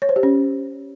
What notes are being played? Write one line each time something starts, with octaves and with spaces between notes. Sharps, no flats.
C#5
C5
G4
C#4